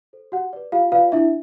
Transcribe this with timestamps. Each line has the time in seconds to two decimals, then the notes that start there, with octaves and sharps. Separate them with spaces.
0.13 A4 C5
0.32 F#4 G4 F#5
0.53 B4 D5
0.72 F4 G4 F5
0.92 F4 B4 D5 F5
1.12 D4 E4 E5